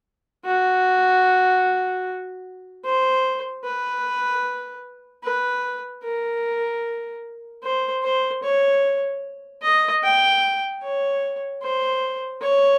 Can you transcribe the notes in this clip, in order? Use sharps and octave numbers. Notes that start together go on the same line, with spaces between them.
F#4
C5
B4
B4
A#4
C5
C5
C#5
D#5
G5
C#5
C5
C#5